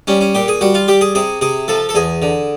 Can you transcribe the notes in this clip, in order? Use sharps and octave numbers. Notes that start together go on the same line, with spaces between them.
G3 C#4
C#4
A#2 G4
G#4
G3 F#4
F4
G3 G4
G#4
C3 G#4
C3 G#4
F3 A4
A4
E2 G#4
D3